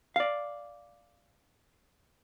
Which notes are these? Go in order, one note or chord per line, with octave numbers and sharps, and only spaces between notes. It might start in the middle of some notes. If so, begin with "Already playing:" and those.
D5 F5